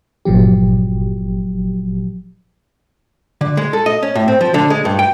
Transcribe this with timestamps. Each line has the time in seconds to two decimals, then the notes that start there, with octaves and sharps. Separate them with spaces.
0.25 G1 A#2 F3 F#3 G4
3.41 D3
3.57 G#3
3.73 A4
3.86 D#5
4.03 C#4
4.15 A2
4.28 C4
4.41 F3
4.54 D3
4.70 G#3
4.85 G2
4.99 G5